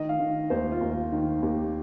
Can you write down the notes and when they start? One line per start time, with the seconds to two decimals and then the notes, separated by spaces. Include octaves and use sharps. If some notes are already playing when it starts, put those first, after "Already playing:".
Already playing: D#3 D#5
0.09 F5
0.19 D#3
0.50 D#2 C5
0.72 F4
0.81 D#2
0.91 F4
1.12 D#3
1.42 D#2 G4